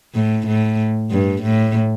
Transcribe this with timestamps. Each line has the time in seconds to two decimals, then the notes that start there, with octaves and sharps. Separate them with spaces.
0.15 A2
0.47 A2
1.11 G2
1.42 A2